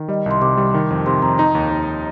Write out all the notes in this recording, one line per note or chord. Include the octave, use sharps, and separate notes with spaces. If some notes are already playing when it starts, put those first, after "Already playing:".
Already playing: D#3
G3 D#5
C2 C6
C3 D6
G3
D#3
F2
C3 C6
F2 A#5
D#4 A#5
D#2
D#2